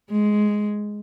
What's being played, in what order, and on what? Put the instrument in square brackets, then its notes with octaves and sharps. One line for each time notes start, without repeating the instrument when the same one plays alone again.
[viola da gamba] G#3